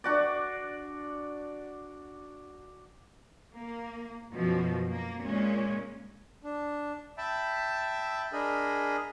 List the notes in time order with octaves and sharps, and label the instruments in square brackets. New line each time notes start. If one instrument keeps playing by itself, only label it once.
[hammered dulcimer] D4 F#4 D5
[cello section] A#3
F#2 B2 F3
A#3
A#2 G#3 C#4
[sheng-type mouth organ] D4
E5 G5 A5 B5
D4 G#4 A#4 D#5 B5